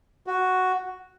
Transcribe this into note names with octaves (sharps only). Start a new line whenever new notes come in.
F#4